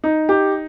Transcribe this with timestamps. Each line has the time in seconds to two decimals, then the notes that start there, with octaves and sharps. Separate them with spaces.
0.04 D#4
0.29 G4